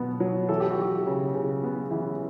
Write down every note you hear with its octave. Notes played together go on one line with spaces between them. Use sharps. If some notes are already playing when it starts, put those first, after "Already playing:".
Already playing: B2 F#3 B3
F#3
E3 A4
G4
F#4
E3 G4
C#3
C#3
B3
E3